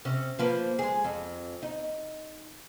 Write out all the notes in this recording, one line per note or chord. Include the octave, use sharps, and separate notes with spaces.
C3 C#4
F3 A#3 B4
G#3 G#4
F2
D#4